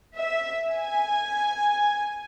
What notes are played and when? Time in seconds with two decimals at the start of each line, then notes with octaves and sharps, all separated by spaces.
0.16 E5
0.75 G#5